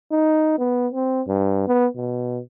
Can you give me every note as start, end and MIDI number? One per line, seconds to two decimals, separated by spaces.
0.11 0.56 63
0.58 0.88 59
0.93 1.22 60
1.27 1.65 43
1.67 1.87 59
1.96 2.40 47